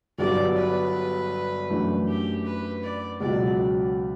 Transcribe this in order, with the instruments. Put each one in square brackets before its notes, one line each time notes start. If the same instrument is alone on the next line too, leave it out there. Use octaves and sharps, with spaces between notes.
[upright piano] G1 G2 F#3 B3 [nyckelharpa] D5
[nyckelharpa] B4
[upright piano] F#2 E3 A3 D4
[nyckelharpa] G4
B4
D5
[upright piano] C#2 B2 F#3 [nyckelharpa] D5